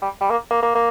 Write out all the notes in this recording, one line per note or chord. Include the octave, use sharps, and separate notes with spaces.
G3
G3
A#3
A#3
A#3
A#3